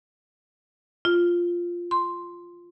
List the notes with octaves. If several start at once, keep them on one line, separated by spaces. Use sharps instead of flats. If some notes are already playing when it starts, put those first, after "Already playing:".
F4
C6